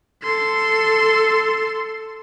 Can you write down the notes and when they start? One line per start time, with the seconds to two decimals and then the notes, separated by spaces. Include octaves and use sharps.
0.23 A4 C6